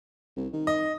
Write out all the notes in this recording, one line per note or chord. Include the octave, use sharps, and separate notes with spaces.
C2
D#3
D#5